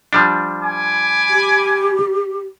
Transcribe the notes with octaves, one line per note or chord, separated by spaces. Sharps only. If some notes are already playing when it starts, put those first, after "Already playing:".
F3 G3 D4
G#5 B5 D6
G4